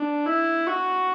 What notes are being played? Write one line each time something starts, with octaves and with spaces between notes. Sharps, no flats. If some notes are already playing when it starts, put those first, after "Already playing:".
Already playing: D4
E4
F#4